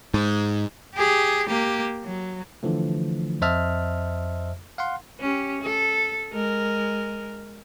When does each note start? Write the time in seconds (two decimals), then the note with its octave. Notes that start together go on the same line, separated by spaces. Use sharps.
0.14 G#2
0.95 G4 G#4
1.47 A#3 G4
2.04 F#3
2.63 D3 E3 F3 A3
3.42 F2 C5 D#5 E5 A5 F6
4.78 F5 F#5 C6
5.20 C#4 G4
5.61 A4
6.32 G#3 A#4